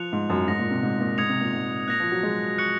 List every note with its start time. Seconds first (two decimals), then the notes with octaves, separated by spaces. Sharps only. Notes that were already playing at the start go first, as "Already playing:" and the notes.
Already playing: F3 F#6 C#7 F7
0.13 G#2
0.30 F#2
0.47 G#2 D#6 A#6 F7
0.59 A#2
0.71 C3
0.83 G#2
1.00 A#2
1.18 G#2 D#6 G#6 C#7 F7
1.29 C3
1.41 A#2
1.53 G#2
1.88 A#2 F#6 A#6 F7
2.00 F3
2.12 F#3
2.23 G#3
2.58 C#6 F#6 C#7 F#7